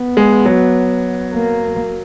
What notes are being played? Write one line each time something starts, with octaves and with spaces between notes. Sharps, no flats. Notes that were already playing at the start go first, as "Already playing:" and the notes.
Already playing: B3
G#3
F#3
A#3